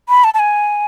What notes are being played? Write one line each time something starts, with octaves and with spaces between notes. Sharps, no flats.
B5
A5
A5
G#5